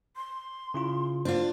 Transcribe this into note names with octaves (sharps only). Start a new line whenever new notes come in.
C6
C#3 E4 F4
A#3 D4 F4 C5